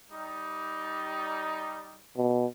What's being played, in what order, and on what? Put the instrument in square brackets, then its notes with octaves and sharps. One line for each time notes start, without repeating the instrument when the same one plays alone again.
[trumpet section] G3 D#4
[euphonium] B2